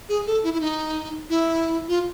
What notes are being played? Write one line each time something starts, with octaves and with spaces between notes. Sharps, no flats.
G#4
A4
E4
E4
D#4
E4
F4